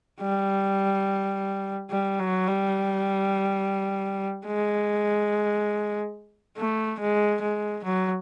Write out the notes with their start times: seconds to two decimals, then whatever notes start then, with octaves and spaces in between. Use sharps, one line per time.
0.21 G3
1.90 G3
2.19 F#3
2.47 G3
4.46 G#3
6.58 A3
7.00 G#3
7.41 G#3
7.84 F#3